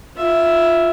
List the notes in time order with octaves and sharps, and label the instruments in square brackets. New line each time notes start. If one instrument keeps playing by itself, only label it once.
[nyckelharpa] F4 E5